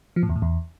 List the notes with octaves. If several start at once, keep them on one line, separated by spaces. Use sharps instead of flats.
F3
A2
E2
A2
E2